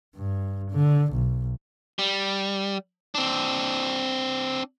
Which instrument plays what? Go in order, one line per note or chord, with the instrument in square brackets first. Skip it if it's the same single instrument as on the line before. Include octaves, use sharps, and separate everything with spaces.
[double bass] G2
D3
B1
[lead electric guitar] G3
C4 D4